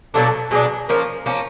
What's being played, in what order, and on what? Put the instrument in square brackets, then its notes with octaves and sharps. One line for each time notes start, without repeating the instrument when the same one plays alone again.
[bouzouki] B2 F#3 A#3 D4 [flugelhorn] A4
[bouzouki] B2 F#3 A#3 D4 [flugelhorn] G#4
[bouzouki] F3 A#3 C#4 [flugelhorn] A#4
[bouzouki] F3 A#3 C#4